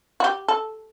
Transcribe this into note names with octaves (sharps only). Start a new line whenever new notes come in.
F#4
G4
A4